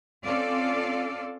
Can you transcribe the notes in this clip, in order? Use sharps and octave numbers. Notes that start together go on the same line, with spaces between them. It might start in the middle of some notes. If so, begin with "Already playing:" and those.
C4 C#4 F4 A4 D5 F5